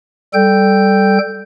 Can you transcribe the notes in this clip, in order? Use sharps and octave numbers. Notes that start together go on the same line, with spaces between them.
G3 A4 G5 G6